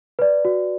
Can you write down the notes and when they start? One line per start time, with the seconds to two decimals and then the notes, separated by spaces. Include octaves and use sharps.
0.19 B4 D5
0.45 F#4